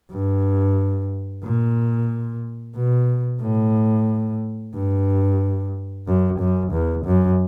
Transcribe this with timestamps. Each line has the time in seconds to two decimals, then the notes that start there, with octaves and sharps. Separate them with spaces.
0.11 G2
1.44 A#2
2.76 B2
3.42 A2
4.74 G2
6.07 F#2
6.40 F#2
6.72 E2
7.05 F#2